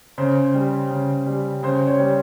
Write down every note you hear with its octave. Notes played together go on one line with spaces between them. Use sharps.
C#3 C5
G3
C#3
G3
C#3 C5
C#5
G3